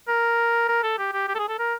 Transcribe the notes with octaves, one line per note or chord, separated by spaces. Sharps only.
A#4
A#4
A4
G4
G4
G4
A4
G#4
A4
A#4